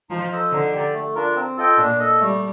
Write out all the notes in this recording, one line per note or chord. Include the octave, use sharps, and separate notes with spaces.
F3 D#4
A4 C5 D#5
D3 D#4
G4 D5
A3
D4 F4 A#4
C4
F4 A4 D#5 G5
A#2 D4
A4 D#5
G3 A3